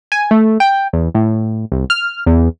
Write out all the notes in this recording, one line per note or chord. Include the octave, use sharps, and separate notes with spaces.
G#5
A3
G5
E2
A2
C2
F6
E2